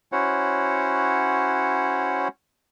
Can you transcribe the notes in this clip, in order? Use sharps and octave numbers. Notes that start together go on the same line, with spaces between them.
C#4 E4 F#4 C5 C#5 F#5